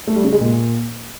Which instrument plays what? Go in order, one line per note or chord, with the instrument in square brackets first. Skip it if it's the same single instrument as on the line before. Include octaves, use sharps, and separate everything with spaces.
[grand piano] A3
G3
C#3
G#3
A#2